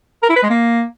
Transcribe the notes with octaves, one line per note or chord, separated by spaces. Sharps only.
A#4
E4
B4
G#3
A#3